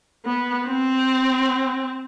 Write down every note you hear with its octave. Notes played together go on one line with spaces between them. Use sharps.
B3
C4